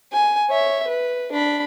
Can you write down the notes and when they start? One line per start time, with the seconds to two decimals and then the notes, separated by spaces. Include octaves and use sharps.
0.12 G#5
0.50 C#5 E5
0.88 B4
1.32 D4 B5